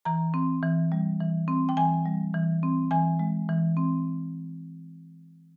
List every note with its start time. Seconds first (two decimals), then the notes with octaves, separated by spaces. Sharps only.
0.05 E3 A#5
0.34 C4
0.63 E3
0.92 G3
1.20 E3
1.48 C4
1.69 G5
1.77 E3 G#5
2.06 G3
2.34 E3
2.63 C4
2.91 E3 G#5
3.19 G#3
3.49 E3
3.77 C4